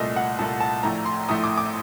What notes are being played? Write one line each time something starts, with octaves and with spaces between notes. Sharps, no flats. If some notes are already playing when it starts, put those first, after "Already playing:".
Already playing: C2 A#2 A3 D#5
F#5
C2 A#2 A3 A5
A5
A#1 A2 A3 A#5
C6
A#1 A2 A3 D#6
D6
D6